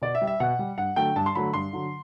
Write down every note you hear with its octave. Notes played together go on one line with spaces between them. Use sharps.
B2 D5
E5
G3
E5
B2 F#5
G3
G2 F#5
D3 F#3 A3 G5
G2 A5
C6
D3 F#3 A3 B5
G2 C6
D3 F#3